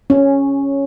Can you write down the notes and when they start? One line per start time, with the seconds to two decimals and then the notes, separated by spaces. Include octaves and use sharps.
0.10 C#4